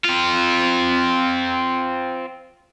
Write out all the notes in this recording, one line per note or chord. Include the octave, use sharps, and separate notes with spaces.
C4 F4